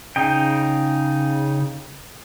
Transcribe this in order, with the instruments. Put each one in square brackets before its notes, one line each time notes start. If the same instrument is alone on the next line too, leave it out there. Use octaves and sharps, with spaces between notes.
[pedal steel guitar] C#3 D#4 G5